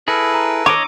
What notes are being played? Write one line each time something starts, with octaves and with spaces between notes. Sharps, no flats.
E4 G#4 A4 B4 F6 A#6 C#7
A#5
C#5 D#5 D6 E6 C#7 D#7